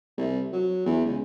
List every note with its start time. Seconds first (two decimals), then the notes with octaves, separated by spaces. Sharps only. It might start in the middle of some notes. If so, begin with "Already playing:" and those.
0.17 C2
0.53 F#3
0.86 E2
1.05 C#2